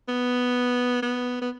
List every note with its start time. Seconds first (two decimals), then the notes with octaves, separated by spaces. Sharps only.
0.08 B3
1.03 B3
1.42 B3